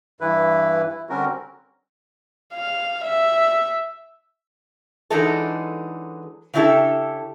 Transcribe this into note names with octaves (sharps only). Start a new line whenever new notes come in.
G2 E3 E4 B4
E4
D3 G3 C4 C#4 F#4 A#4
F5
E5
E3 F#3 G#3 D4 D#4 A4
C#3 D4 E4 G4 A4